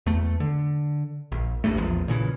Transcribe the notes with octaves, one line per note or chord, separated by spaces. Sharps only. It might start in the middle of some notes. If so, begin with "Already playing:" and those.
E2 A3
D3
A#1
E1 A1 G2 A3
A#1 E2 F3
A#2 C#3 E3